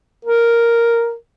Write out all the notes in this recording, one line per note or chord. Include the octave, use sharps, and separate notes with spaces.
A#4